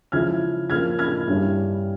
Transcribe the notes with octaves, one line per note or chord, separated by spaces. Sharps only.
C#3 F3 G#3 E4 F6 G#6
C#3 F3 A#3 F4 F6 G#6
F6 G#6
G2 G3 C#4 E4